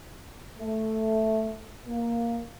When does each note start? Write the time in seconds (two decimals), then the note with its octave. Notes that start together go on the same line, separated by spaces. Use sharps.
0.58 A3
1.87 A#3